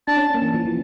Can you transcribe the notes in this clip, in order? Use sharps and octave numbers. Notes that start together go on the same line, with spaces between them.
D4 A5
C#4
A#3
E3
F3
E3